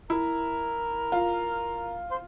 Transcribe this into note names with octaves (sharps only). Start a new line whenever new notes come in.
E4 A#4
F4
C5